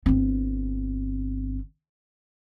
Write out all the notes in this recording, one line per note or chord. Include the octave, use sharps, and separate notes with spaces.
G1 C4